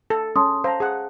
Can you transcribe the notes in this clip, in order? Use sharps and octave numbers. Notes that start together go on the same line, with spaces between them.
A4
C#4 A5 C6 D#6
C5 F5 A5 A#5
G#4 F#5